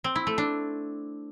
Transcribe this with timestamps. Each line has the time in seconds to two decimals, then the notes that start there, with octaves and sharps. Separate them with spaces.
0.04 C4
0.16 E4
0.27 A3
0.38 D4